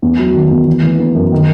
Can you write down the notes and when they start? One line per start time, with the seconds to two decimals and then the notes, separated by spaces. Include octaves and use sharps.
0.02 E2
0.19 F#3
0.34 D#3
0.51 E2
0.67 E3
0.83 E3
0.99 B3
1.15 F#2
1.32 D#3